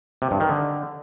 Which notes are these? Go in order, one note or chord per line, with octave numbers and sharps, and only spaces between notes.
C3
G2
D#3
D3